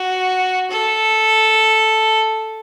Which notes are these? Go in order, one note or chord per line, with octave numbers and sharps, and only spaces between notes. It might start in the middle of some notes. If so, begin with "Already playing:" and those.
Already playing: F#4
A4